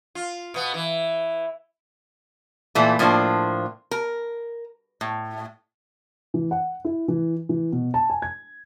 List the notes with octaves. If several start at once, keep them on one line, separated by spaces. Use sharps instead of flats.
F4
B2 B3
E3
A#2 E3 A3
A2 F3 A#3 D4 C5
A#4
A2
E3
F#5
E4
E3
E3
B2
A5
G#5
G#6